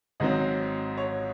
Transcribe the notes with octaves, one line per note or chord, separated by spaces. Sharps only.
G#1 G#2 F#3 C4 D#5
C#5